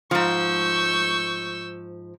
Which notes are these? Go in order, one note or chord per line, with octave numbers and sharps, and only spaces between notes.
G#2 F3 C#6 E6 G6